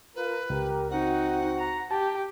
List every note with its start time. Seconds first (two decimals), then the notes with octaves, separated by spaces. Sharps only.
0.16 F4 A#4 B4
0.50 C#2 G4 A#4
0.91 C4 D#4 F#4 F#5
1.58 A#5
1.91 G4 A5